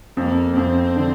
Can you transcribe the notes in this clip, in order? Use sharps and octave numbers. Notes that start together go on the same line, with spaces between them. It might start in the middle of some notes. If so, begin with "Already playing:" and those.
F2 A#3
F2 C4
D3